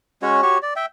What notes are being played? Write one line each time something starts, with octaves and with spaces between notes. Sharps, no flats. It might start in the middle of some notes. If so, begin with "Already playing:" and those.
G#3 C#4 F#4 C#5
F#4 G4 C#5 C#6
D5
E5 G5